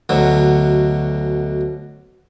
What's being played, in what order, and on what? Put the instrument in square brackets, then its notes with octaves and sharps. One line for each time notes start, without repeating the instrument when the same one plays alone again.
[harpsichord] D2 B2 F#3